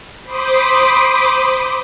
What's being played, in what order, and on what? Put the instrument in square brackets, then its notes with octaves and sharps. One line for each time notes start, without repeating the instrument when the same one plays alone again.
[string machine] C5 B5 C6 D6 D#6